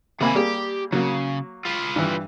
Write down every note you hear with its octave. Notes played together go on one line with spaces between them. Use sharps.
C3 D#3 A#3 G#5 B5
G3 A#3 G4 G#4
C#3 F#3 A#3
F4 B4
G2 E3